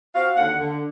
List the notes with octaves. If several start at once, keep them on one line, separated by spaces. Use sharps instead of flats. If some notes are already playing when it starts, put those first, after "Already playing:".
C4 F#4 F5
D#2 D3 F#5
D3